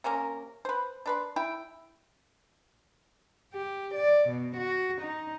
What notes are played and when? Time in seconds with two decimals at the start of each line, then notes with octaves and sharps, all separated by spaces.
0.04 C3 A#3 C#4 A#4
0.65 B4 C5
1.06 D4 B4 C6
1.36 E4 G5
3.53 G4
3.94 D5
4.28 B2
4.57 F#4
5.01 D#4